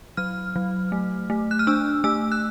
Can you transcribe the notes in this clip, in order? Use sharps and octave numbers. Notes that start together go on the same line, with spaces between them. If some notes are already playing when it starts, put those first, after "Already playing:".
F#3 F6
F#3
A3
A3
F#6
F6
D4 E6
A3 E6
F#6